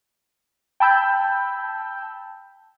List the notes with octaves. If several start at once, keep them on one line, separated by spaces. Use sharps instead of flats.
G5 A5 B5 E6 G6